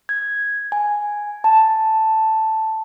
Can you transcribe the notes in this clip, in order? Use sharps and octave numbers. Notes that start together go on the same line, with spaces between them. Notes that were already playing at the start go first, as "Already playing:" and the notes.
G#6
G#5
A5